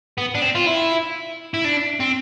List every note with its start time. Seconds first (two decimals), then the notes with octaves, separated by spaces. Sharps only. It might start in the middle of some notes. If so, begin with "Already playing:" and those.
0.18 B3
0.35 D4
0.42 C4
0.55 F4
0.66 E4
1.54 E4
1.64 D4
2.00 C4